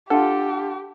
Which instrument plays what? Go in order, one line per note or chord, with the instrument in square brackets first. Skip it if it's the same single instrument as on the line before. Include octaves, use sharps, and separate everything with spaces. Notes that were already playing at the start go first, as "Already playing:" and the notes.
[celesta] D4 F#5 [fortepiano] F4 A4 [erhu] G4